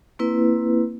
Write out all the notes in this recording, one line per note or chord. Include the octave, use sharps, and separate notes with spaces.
A#3 C4 E4 B4